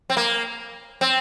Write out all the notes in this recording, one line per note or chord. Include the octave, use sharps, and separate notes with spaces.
C4
A#3
C4